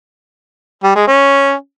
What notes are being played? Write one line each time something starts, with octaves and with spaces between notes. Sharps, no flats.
G3
G#3
C#4